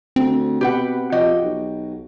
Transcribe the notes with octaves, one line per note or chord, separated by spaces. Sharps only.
D2 C4
B2 G4 B4 F#5
F3 F#4 G4 D#5
B1